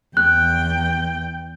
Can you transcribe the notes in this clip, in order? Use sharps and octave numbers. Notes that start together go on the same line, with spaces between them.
E2 G5 F#6